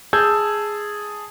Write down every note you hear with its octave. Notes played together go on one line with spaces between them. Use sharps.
G#4 A5 E6 G6 G#6